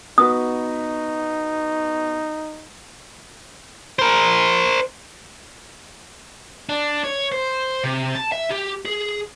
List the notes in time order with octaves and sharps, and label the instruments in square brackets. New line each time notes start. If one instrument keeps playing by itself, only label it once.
[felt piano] B3 F#4 B4 [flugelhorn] D#4 [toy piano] D#6
[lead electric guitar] A#4 C5
[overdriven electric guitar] D4
C#5
C5
C3
A5
E5
G4
G#4